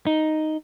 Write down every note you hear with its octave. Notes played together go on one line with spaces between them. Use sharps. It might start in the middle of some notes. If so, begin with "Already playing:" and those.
D#4